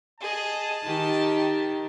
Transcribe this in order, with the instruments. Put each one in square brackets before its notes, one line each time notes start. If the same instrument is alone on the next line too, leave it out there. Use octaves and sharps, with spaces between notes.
[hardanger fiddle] G#4 D#5 [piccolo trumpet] A5
[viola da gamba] D#3 [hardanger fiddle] G4